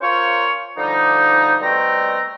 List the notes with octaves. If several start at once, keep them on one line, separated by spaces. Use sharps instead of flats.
C#4 F4 A#4 C5 C#5 C#6
D3 F3 G3 D#4
B2 G3 A3 C4 G5 A#5